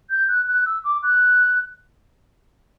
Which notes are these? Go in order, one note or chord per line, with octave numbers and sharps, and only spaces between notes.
G6
F#6
F#6
E6
D6
F#6